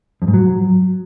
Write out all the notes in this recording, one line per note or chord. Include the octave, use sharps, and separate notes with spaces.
F2
G#2
F#3